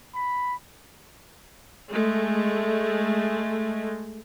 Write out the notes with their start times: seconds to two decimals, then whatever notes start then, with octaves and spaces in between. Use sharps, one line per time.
0.15 B5
1.91 G#3 A3